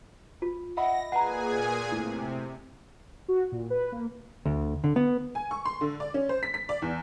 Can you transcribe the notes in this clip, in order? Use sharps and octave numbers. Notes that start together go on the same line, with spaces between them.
F4
D#5 E5 F#5 B5 A#6
A#2 G#4 B4 F#5 G#5 A#5
A2 C3
F#4
A#2
B4
A#3
D2
D3
B3
G#5
C#6
C6
D3
D5
C#4
C5
B6
B6
D5
E2